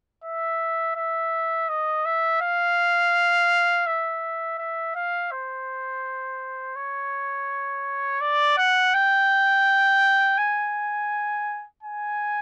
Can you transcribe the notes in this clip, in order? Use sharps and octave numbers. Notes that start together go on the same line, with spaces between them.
E5
E5
D#5
E5
F5
E5
E5
F5
C5
C#5
D5
F#5
G5
G#5
G#5